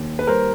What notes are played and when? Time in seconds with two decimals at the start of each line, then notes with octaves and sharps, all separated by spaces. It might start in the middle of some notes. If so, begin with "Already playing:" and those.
Already playing: D#2
0.19 B4
0.27 G3 A#4 C5